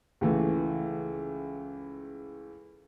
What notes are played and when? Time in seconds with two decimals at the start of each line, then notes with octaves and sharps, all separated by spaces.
0.21 C#2 E3 A3